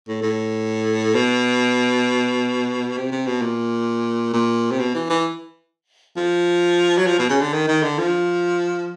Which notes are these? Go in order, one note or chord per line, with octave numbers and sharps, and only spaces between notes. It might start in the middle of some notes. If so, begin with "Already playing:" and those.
A2
A2
B2
C3
C3
B2
A#2
A#2
C3
B2
E3
E3
F3
F#3
F3
B2
C#3
D3
D#3
D#3
D3
F3